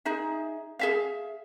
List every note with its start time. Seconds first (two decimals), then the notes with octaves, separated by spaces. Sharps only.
0.05 D#4 G#4 E5
0.79 G#4 E5 F5